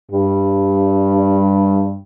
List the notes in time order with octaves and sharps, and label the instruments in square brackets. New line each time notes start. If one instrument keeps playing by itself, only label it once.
[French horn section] G2 G3